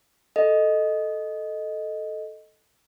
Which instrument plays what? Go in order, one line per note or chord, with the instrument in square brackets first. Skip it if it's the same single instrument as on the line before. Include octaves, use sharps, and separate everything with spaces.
[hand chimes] A4 D#5